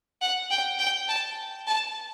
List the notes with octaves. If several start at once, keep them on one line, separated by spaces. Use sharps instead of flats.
F#5
G5
G5
A5
A5